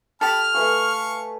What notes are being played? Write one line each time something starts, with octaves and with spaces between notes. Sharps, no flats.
G4 A4 A5 B5 F6
A3 B4 F5 G#5 C#6